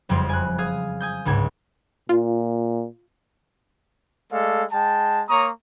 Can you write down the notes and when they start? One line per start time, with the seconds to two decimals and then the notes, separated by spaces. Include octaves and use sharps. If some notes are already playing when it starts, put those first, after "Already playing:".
0.09 F#1 F2 G3 C4 C6
0.29 G#5 F#6
0.58 G#4 F5 G#5 D#6
1.00 G#5 D#6 G6
1.25 G1 C#2 G#2 G#6
2.09 A#2 F4
4.31 G#3 A3 A4 D5 F5
4.72 G#3 G5 A5
5.29 A#3 C#5 A#5 C#6 D#6